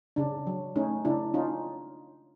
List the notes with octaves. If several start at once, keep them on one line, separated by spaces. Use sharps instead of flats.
C#3 D4
F#3
A3 C#4 D#4
C#3 D4 E4
C#4 D#4 F4